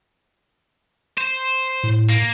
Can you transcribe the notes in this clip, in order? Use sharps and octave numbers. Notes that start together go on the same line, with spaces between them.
C5
A2
A#3